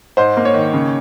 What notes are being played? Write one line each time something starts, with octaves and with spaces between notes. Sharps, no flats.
G#2 C5
A#3
C#5
D#3
C#3